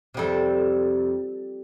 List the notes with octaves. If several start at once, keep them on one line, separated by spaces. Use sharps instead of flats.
F2 C3 G3 A4